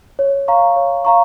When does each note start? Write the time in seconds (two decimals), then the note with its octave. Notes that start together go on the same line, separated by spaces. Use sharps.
0.19 C#5
0.48 F5 A#5 C#6
0.76 C#5
1.05 F5 A#5 C#6